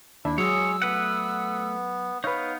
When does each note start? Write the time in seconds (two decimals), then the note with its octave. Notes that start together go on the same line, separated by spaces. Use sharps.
0.25 D#2 D4 E4 E5
0.38 F#3 G#3 G#4 C#5 E6
0.82 A3 B3 B4 F#5
2.24 B3 D#4 B4 C#5 F5